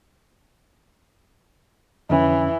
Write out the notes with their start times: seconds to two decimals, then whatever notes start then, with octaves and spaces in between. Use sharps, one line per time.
2.10 F2 D3 E3 C#4